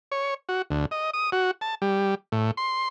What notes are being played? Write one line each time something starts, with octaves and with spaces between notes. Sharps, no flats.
C#5
F#4
D2
D#5
D#6
F#4
A5
G3
A2
C6